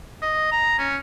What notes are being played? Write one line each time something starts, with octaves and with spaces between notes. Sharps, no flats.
D#5
A#5
C#4